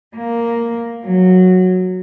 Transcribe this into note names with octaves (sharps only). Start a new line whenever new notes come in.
A#3
F#3